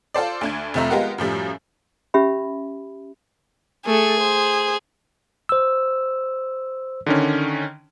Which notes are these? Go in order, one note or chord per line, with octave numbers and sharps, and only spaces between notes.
F4 A4 C5 D5
D2 D4 G#6
F1 C3 F3 A3 E5 A#5
G#3 B3 F4 G4 A#4 F#5
F#2 A2 F3 G3
C#4 G4 E5 B5
A3 G#4 A4
C5
C5 E6
D3 D#3 C#4